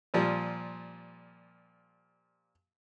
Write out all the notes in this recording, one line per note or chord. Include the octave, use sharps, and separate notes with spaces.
A#2 F3 G3